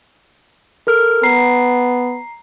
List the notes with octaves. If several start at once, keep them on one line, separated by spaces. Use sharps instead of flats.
A4 A#4 F6
B3 A#5 C7